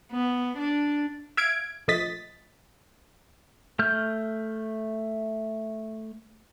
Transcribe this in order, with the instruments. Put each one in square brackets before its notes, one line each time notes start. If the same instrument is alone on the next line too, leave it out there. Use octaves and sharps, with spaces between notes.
[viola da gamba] B3
D4
[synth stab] E5 F5 G#6 D7
A#1 F3 A3 D#5 A6 B6
[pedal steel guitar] A3 F6 G6